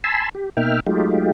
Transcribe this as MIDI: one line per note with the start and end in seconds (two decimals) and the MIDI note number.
0.04 0.29 80
0.04 0.29 81
0.04 0.29 83
0.04 0.29 84
0.04 0.29 88
0.35 0.49 67
0.57 0.80 47
0.57 0.80 58
0.57 0.80 63
0.57 0.80 76
0.57 0.80 79
0.57 0.80 89
0.87 1.32 54
0.87 1.32 56
0.87 1.32 57
0.87 1.32 63
0.87 1.32 65
0.87 1.32 67